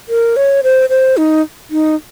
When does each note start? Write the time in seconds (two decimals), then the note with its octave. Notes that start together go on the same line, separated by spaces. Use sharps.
0.09 A#4
0.36 C#5
0.63 C5
0.89 C5
1.17 D#4
1.71 D#4